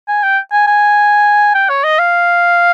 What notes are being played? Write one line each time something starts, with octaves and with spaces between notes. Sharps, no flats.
G#5
G5
G#5
G#5
G5
C#5
D#5
F5